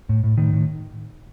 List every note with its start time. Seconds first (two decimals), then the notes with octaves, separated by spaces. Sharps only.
0.09 A2
0.24 A2
0.38 A2 D#3
0.53 A2